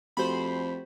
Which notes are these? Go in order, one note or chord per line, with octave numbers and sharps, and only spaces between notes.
F2 A3 F#4 G4 C5 B5